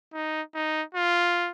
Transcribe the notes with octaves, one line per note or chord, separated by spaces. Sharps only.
D#4
D#4
F4